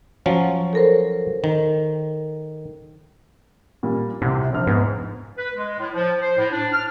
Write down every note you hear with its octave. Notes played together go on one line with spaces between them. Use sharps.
F3 F#3 C#4
A4 A#4 C5
D#3
A#2 G3
C2 C3
F1 A#1 F6
G#2 B3
B4
G#3
A2
F3
C5
A2
D4
F6